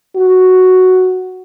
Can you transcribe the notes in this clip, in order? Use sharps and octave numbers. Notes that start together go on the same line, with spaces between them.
F#4